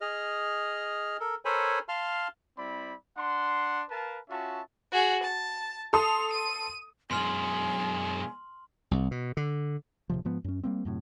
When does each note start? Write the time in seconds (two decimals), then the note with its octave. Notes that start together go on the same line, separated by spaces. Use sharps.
0.01 G#4 D#5 F6
1.20 A4 A#4
1.45 A4 A#4 C5 C#5 G#5 B5
1.89 F5 A5 C6 F6
2.58 G3 C4 E4 D5 B5
3.17 D4 F#5 C6
3.90 A#4 B4 F5 A5
4.29 C#4 F4 F#4 E5 A5
4.92 F#4 G#4
5.23 A5
5.93 A4 C6 D#6 F7
6.33 D#7
7.11 F#2 B2 G#3 G#5 C6 F6 F#7
8.91 C2
9.11 B2
9.37 D3
10.10 D1 C3 F3
10.25 G#2 F3 B3
10.44 F#2 C#4
10.63 G3 A#3 C4
10.85 F#2 A2 C3